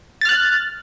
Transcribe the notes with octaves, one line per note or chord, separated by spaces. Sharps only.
F6 F#6 A6